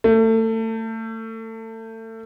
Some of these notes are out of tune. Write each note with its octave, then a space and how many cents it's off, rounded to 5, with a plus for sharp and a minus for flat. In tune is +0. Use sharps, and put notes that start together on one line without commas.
A3 +30